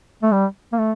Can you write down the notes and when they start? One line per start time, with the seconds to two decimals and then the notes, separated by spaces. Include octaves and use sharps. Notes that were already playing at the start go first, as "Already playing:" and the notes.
0.23 A3
0.32 G3
0.73 A#3
0.78 A3